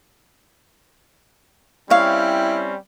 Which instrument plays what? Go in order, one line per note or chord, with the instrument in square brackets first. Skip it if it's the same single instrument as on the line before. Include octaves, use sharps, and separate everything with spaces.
[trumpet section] G3 C4 C#4 [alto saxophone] E4 [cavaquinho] C#5 F5